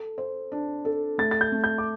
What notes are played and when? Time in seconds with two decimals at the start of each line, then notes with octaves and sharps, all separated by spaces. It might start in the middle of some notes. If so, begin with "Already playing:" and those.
Already playing: A4
0.18 C5
0.52 D4
0.85 A4
1.18 A3 A6
1.31 A6
1.41 G6
1.52 A3
1.64 G6
1.78 D6